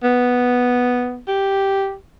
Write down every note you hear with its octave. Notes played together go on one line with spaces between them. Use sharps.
B3
G4